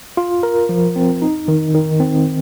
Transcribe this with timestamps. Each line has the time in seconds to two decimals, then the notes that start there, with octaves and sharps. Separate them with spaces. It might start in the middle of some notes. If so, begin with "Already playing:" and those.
0.17 F4
0.43 A#4
0.69 F3
0.96 C4
1.22 D#4
1.48 D#3
1.75 D#3
2.00 C4